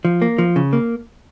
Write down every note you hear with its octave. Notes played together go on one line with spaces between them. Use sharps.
F3
A#3
F3
C#3
A#3